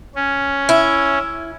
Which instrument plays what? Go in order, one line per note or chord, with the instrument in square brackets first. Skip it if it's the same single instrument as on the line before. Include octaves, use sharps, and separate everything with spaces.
[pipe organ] C#4
[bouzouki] E4